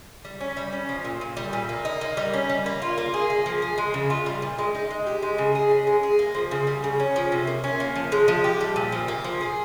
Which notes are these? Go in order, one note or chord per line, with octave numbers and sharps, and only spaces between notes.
G3
C#4
G3
C#4
F3
A#2
A#2
G3
A#2
A#3
D#4
A#3
G3
C#4
G3
A#3
F4
A#3
G#4
A#3
F3
G#4
G#3
C#3
F4
G3
A#2
G#3
D#4
G#3
G4
G#3
C#3
G#4
C#4
G#3
G#4
A#3
F3
C#3
G3
C#3
C#4
F3
C3
A#3
C#4
A#3
F3
G#3
F3
G4
G3
A#2
F3
A#3
F3
G#4